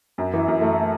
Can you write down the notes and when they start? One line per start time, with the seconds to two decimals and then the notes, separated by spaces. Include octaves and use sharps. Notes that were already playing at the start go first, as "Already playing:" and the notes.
0.18 F#2
0.34 E3
0.48 F#2
0.61 A3
0.76 A3